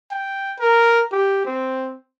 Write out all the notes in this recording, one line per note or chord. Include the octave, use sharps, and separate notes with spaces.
G5
A#4
G4
C4